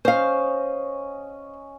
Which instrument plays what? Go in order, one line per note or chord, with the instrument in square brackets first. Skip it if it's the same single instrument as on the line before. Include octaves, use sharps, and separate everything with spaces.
[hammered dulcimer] C#4 D#5 [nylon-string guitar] C5 F5